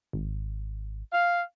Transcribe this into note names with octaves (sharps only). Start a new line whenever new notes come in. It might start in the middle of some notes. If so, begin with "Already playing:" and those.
G#1
F5